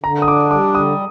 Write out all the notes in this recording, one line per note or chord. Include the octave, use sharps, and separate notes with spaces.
D3 A#5
D#6
D4 D6
G3 D6
D3 D#6